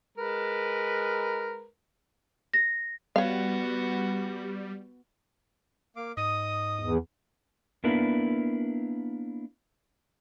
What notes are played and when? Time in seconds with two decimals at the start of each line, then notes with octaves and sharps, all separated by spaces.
0.18 G#3 A#4 B4
2.54 A#6
3.16 G3 B3 F#4 C#5 F5
5.96 A#3 F5 D6
6.17 G#2 D#5 D#6
6.80 E2
7.84 A#3 B3 D4 E4 A#4 B4